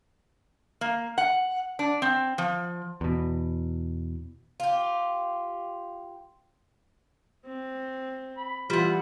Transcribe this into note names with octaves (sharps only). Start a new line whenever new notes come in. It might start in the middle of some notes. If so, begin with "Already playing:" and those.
A#3
F#5
D4
C4
F3
E2 B2
F4 G4
C4
B5
E3 G3 F4 F#5